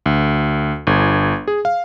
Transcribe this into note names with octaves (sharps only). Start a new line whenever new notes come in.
D2
G1
G#4
F5